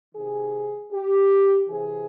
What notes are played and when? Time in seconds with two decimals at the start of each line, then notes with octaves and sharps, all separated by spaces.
0.15 C3 D#3 G#4
0.92 G4
1.67 C3 E3 G#4